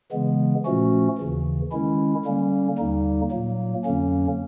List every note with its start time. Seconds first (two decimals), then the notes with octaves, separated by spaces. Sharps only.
0.12 C#3 E3 G#3 B3
0.66 A#2 F3 A3 C#4 F#4
1.18 D#2 C#3 E3
1.72 D#3 G#3 C#4 E4
2.25 D3 G3 A#3 C#4
2.78 D#2 D3 G3 A#3 D#4
3.31 A#2 F#3 A#3
3.84 F2 D3 F#3 A#3 C#4